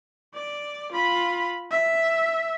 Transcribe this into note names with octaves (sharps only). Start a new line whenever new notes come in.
D5
F4 B5
E5